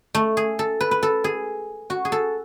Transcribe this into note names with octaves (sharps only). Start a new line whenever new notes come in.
A3
G#4
A4
B4
B4
A4
G#4
F#4
G#4
A4